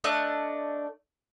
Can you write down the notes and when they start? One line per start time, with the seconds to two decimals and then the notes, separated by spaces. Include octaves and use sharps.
0.04 A3 D4 D#5 F#6